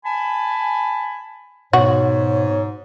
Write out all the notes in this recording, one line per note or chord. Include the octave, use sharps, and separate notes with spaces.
G#5 A5 B5
G#2 B2 F#4 C#5